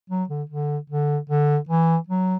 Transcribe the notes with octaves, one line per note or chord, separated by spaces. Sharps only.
F#3
D3
D3
D3
D3
E3
F#3